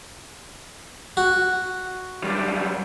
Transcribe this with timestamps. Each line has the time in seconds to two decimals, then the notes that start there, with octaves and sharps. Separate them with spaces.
1.17 F#4
2.24 F#2 G3